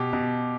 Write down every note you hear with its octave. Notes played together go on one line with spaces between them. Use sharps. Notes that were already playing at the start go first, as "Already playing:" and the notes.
Already playing: B2 G4
B2